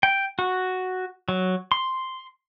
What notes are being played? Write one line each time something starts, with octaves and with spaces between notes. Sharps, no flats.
G5
F#4
F#3
C6